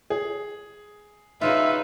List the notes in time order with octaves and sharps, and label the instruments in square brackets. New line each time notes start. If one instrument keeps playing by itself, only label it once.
[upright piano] G#4
[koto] C#3 F#3 F4 [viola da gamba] D#4 B4 [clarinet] E5